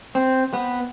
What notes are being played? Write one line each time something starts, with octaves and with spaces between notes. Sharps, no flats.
C4
B3